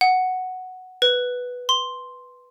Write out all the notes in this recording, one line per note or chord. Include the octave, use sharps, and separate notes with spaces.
F#5
B4
C6